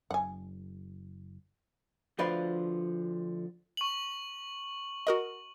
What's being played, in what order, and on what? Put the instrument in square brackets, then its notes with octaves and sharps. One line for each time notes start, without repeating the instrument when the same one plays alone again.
[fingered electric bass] F#1 [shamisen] F#5 G#5
[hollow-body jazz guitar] D2 D3 F3 B4 D5 F5
[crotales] C#6 F#7
[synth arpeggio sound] F#4 A#4 D#5